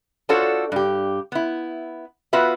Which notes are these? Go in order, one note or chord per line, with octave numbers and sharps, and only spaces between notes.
D4 F4 F#4 A4 C5 C#5
G2 G4
B3 E4
B3 F4 F#4 B4 E5